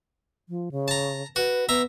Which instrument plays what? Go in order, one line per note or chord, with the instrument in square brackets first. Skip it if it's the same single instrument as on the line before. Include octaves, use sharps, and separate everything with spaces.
[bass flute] F3
C#3
[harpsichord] A5 A#5
[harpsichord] F#4 [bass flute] B4
[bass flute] B3 [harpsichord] E5 A#5